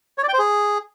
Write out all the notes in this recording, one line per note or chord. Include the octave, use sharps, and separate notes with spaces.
C#5
D5
G5
C5
G#4